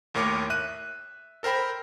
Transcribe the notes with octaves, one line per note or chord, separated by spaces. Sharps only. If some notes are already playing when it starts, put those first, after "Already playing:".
D#2 A2 A#4 C#5 D6
E5 F#6 D#7
A4 A#4 C5 G5 B5